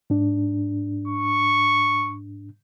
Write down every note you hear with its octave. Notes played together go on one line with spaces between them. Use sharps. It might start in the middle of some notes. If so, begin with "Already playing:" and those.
G#2 D4
C#6